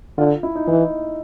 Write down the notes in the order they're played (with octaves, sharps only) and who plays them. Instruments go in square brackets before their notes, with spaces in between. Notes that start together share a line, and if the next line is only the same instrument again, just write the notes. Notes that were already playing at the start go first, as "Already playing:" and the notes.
[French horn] D3 [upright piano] F4
[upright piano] E4
D#4
[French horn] E3 [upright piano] D#4